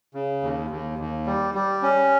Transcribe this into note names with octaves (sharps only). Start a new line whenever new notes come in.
C#3
D#2
D#2
D#2
G3
G3
C#4